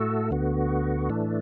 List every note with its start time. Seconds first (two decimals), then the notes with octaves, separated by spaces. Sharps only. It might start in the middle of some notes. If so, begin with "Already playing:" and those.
Already playing: A2 A3 F#4 A4
0.31 D2 D3 B3 F#4
1.10 A2 E3 A3 D4